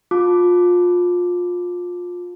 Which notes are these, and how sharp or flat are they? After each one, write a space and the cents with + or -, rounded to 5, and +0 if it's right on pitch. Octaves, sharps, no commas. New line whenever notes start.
F4 +25 A5 +0 D6 +0